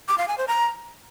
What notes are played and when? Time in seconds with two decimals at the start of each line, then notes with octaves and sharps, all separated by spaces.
0.08 D6
0.18 F5
0.28 G#5
0.38 C5
0.48 A#5